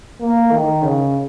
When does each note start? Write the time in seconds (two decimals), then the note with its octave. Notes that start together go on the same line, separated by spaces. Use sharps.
0.20 A#3
0.52 D#3
0.82 C#3